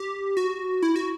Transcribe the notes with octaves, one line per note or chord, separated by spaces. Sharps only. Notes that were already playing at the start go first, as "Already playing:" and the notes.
Already playing: G4
F#4
E4
F#4